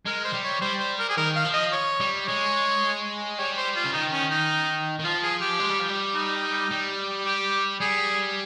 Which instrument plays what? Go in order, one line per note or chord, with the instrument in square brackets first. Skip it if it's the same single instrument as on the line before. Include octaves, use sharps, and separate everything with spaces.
[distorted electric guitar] G#3 [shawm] A#4
[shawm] C5
[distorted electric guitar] G3
[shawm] C#5
[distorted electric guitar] G3 [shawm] C5
[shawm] C5
A#4
G#4
[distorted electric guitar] D#3 [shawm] A#4
[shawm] F5
[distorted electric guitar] F3
[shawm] D#5
C#5
[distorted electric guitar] G3
[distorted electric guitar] G#3 [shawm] C#5
[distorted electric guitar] G3 [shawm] C#5
[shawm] C5
F4
[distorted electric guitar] C#3
[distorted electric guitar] D#3 [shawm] D#4
[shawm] C#4
D#4
[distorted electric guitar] D#3
[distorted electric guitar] F3 [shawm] F4
[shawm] G#4
G4
[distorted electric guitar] G#3
G3
F3
G3
[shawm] D#4
[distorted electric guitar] G3
[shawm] G4
[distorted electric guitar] G3 [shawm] G#4